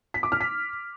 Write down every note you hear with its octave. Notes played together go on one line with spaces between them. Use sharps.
B6
D6
F6
B6